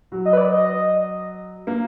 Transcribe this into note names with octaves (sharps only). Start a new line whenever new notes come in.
F#3
D#5
B4
D5
D#5
A#3